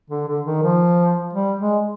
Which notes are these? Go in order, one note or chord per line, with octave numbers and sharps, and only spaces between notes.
D3
D3
D#3
F3
G3
G#3